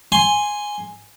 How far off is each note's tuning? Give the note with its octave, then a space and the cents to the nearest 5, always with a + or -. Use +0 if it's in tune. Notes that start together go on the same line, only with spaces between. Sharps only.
G#5 +0 C6 +5